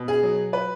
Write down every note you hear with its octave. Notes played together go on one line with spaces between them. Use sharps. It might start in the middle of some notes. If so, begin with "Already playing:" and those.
Already playing: B2
G#4
F#3
B4